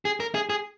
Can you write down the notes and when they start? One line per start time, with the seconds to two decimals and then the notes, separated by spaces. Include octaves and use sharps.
0.05 G#4
0.20 A#4
0.35 G#4
0.50 G#4